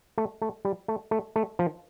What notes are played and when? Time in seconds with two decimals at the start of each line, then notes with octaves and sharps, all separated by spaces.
0.18 A3
0.42 A3
0.65 G3
0.88 A3
1.11 A3
1.36 A3
1.59 F3